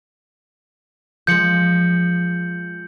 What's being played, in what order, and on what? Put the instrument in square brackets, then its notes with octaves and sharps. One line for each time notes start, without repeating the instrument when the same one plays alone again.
[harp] F3 G#3 [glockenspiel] G6 C#7 F#7